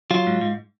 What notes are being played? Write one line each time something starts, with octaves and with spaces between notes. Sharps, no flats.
F#3 F4
G#2
G#2